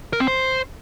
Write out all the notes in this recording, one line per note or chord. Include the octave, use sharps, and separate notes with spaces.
A#4
C4
C5